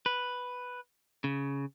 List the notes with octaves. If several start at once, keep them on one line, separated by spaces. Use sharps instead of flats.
B4
C#3